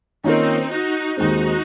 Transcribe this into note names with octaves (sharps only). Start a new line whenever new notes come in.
D#3 A#3 C4 C#4 D#4 F4 A#4
D#4 F#4
D#2 D#3 G#3 C4 D#4 F#4